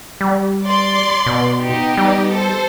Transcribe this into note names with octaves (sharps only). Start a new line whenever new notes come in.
G3
D5 C6
B2
B3 D#4 G4
G3
A4 C5